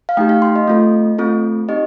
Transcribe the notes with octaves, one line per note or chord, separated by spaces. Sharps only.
F5
A3 D#4 G4 G5
F5
C6
D#5
A3 C4 F4 A4
A3 C4 F4 A4
C4 D#4 G4 D#5